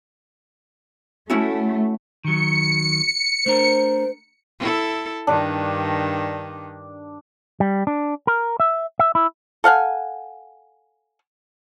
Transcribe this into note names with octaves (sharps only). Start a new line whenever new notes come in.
A3 C#4 E4 F#4
D#3 F#3 C#7
A3 D4 A#4 C5
E4 A4
G2 D#3 D4
G3
D4
A#4
E5
E5
E4
A4 F5 F#5 G#5